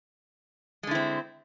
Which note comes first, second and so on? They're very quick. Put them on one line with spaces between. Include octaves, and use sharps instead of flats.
G#3 D3 E4 C4